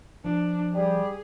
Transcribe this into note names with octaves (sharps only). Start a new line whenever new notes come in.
F3 D4
G3 G4 G#4